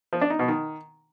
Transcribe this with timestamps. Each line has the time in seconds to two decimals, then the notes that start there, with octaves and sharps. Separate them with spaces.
0.13 F3
0.21 D4
0.30 D#4
0.39 B2
0.48 D#3